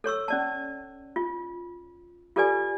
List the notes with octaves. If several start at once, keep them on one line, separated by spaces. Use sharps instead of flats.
A4 C#5 C#6 E6
C#4 D5 A5
F4
F4 G4 A4 B4 D5 G#5